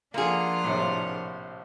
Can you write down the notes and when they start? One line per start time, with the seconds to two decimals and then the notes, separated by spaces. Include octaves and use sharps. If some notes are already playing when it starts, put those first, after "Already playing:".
0.14 F3 A#3 D4 F4 G#4 F#5 F6
0.64 A#1 A2 C3